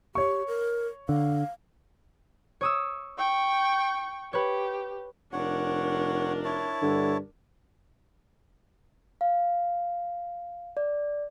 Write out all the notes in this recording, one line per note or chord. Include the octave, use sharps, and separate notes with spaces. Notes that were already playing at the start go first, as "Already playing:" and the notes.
G4 C#5 C#6
A#4
D3 F5
C#5 D#6 E6
G5 C#6
G4 B4 C#5
F1 D4 A#4 C#5 F#5
E4 C#5 A5
G2 D3
F5
D5